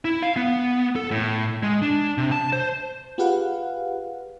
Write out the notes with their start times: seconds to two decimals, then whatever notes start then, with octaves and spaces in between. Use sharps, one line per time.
0.05 E4
0.23 F5
0.36 B3
0.96 A4
1.11 A2
1.63 G#3
1.82 D4
2.18 C3
2.32 A5
2.53 C5
3.18 F4 G4 G#4 B4 F5 F#5